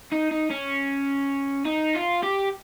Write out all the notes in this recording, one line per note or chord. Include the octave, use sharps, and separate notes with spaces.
D#4
D#4
C#4
D#4
F4
G4